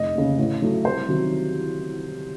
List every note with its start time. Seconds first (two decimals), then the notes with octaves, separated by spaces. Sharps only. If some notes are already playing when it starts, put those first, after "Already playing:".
Already playing: F1 D#5
0.15 D#2 C#3
0.38 A1
0.62 A2 F#3 A3
0.85 C2 C5
1.08 C3 D#3 F#3